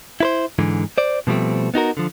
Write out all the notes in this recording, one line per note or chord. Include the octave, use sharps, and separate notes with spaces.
E4 B4 C5
G#2 D3 E3
C5 D5
B2 F3 G3 A3 C4
B3 D#4 F#4 A#4
D3 F3